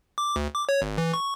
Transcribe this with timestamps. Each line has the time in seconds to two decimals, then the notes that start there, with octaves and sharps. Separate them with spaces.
0.18 D6
0.36 D2
0.54 D6
0.69 C#5
0.82 G#1
0.98 E3
1.14 C#6